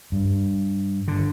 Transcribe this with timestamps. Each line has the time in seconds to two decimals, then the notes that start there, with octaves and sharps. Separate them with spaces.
0.12 G2
1.08 D3